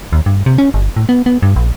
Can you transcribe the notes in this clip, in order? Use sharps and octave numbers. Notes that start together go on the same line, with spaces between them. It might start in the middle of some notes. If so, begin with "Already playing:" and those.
D#2
G2
C3
C#4
G1
A2
B3
B3
G2
A#1